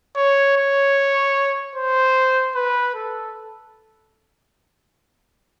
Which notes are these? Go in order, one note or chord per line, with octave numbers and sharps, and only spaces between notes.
C#5
C#5
C5
B4
A4